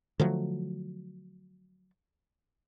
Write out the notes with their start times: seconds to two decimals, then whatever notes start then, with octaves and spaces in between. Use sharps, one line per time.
0.20 D3 F3 F#3 A3